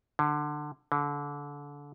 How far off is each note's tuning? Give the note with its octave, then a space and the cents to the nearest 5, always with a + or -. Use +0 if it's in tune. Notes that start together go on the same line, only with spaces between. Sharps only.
D3 +20
D3 -25